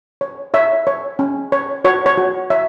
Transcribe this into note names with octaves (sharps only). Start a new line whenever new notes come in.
C#5
C#5 E5
C#5
C#4
C#5
F#4 C#5
C#5
F#4
C#5 E5